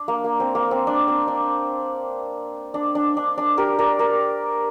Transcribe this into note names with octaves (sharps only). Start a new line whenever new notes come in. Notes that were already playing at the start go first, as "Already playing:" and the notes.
Already playing: D4
A#3
A#3
C4
A#3
C4
D4
C4
D4
D4
D4
D4
D4
G4 A#4
A#4 D5
A#4 D5